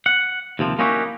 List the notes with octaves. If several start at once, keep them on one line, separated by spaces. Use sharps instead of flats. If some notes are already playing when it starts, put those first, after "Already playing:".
F#5
D#2 C3 F3
A#3 C#4 D#4 E4 F#4 G4